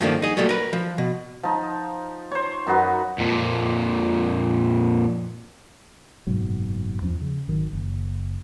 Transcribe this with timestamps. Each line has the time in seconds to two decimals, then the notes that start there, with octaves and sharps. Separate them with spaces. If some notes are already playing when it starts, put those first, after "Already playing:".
0.01 G2 D#3 F3 A3 A#3 D4
0.22 D#4 G#4
0.37 F#3 G3 A3 A#3
0.49 A#4 B4
0.73 F3
0.98 B2
1.43 F3 D#4
2.31 C5 C#5
2.67 F#2 D#4 F#4 B4
3.19 F2 A#2
6.27 F#1 G#2 B2 F#3
7.02 E2 F3 C#4
7.22 C#3
7.48 G#1 D#3 F#3
7.73 F#1